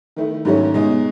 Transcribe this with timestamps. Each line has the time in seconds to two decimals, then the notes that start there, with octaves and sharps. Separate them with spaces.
0.16 D#3 A3 E4
0.45 G#2 D#3 F#3 A3 C#4
0.74 B2 G#3 D#4